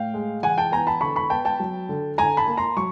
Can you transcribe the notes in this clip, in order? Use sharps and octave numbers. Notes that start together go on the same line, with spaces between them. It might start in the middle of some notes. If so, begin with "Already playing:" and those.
Already playing: A2 F5 G5
G#3
E3 F#5 G#5
G5 A5
B3 G#5 A#5
A5 B5
D3 B5 C#6
B5 C#6
B3 G5 A5
G5 A5
F#3
D3
D3 G#5 A#5
A5 B5
A#3
A#5 C6
F#3 C#6